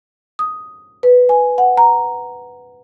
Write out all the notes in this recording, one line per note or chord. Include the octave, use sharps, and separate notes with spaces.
D#6
B4
G#5
F#5
A#5